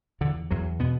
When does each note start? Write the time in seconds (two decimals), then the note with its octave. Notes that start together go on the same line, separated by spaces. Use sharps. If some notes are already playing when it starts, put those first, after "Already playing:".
0.21 E2 D3
0.51 E2 F#3
0.79 B2 B3